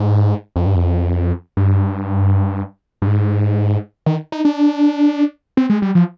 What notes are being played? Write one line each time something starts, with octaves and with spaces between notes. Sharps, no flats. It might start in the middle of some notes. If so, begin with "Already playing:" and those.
Already playing: G#2
F2
G2
F2
G2
G2
G#2
D#3
D#4
D4
C4
G#3
G3
F3